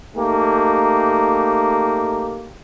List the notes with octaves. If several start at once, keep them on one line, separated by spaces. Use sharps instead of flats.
A3 A#3 D#4 G4